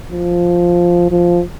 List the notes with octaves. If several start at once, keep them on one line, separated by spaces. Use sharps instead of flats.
F3
F3